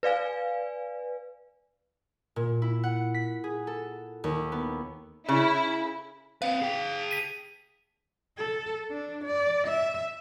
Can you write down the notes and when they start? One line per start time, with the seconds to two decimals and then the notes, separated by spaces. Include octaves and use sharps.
0.03 B4 D5 F5 G#5
2.36 A#2
2.62 E4
2.83 F#5
3.14 B6
3.44 G#4
3.67 A4
4.24 D#2
4.52 B3
5.29 C#3 E4
6.42 C4 B4 F5
6.61 G#4 G5
7.11 B6 D#7
8.38 A4
8.91 D4
9.25 D5
9.67 E5